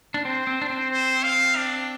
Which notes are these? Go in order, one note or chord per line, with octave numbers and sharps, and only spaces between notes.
D4
C4 C5
C4
D4
C4
C5
F5
D4